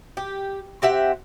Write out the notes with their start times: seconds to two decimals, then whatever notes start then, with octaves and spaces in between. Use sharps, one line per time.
0.17 G4
0.82 C4 G4 E5 F#5